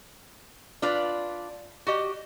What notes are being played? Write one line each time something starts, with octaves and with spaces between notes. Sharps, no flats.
D4 F4 B4 D5
F#4 G4 D#5